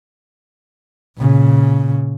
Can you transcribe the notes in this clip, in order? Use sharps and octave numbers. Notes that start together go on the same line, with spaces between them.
A#2 C#3